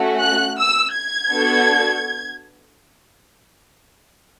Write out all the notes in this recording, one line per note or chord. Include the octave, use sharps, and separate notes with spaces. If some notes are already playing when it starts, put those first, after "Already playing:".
Already playing: A3 C#4 F#4
F#6
E6
G#6
B3 D4 F#4 A4